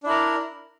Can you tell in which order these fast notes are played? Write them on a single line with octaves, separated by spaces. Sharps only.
D4 E4 A#4